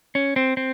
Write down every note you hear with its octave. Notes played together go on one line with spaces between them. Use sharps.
C#4
C4
C4